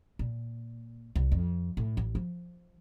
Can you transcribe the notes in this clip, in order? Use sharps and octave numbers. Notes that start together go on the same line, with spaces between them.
A#2
C2
F2
A2
A1
F3